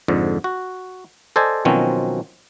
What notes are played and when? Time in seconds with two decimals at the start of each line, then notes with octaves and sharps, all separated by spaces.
0.08 F2 G#2 D3
0.44 F#4
1.36 A4 C5 D5 D#5 G#5
1.65 B2 D#3 F3 F#3 C4 C#4